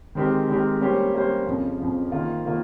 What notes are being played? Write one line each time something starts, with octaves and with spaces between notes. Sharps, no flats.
D#3 G#3 C4 G4 A#4
D#3 G#3 C4 G4 A#4
G3 A#3 C#4 G4 C5
G3 A#3 C#4 G4 C5
F2 C#3 F3
F2 C#3 F3
D#3 A#3 F4
D#3 A#3 F4